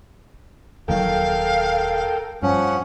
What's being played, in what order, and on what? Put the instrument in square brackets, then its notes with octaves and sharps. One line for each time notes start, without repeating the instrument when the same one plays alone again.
[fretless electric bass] D#1 D#3 F#3 [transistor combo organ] A4 A#4 G5 [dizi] F5
[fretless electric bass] G2 [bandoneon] F3 C#4 [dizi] F#5